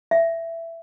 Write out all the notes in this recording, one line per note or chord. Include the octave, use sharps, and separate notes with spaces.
E5